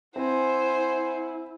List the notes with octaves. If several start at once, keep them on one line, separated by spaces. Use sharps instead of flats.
C4 E4 C5 F#5 G#5